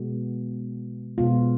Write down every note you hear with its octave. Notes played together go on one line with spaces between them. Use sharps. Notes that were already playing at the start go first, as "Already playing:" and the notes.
Already playing: B2 G#3 B3 F#4
B2 G#3 B3 F4